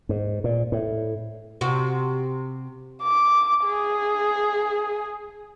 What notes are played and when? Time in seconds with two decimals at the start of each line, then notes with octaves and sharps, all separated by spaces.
0.09 G#2
0.44 A#2
0.72 A2
1.61 C3 F#4
3.03 D6
3.65 G#4